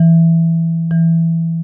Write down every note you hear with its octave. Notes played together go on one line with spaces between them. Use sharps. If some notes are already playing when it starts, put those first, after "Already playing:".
Already playing: E3
E3